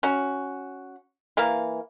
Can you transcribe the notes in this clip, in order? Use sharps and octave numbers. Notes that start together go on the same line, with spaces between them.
C#4 F#4
E3 A#3 F5